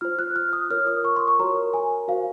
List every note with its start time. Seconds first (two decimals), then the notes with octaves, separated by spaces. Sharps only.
0.01 F4 C5 F6
0.19 F#6
0.36 F6
0.53 D#6
0.70 F4 A#4 C#5 F6
0.87 D#6
1.05 C#6
1.16 C6
1.28 C#6
1.39 F#4 A#4 C#5 A#5
1.74 G#5
2.08 F#4 C5 F5